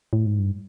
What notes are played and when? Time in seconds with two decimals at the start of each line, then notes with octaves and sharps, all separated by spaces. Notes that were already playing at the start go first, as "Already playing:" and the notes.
0.13 A2
0.26 G#2
0.39 G2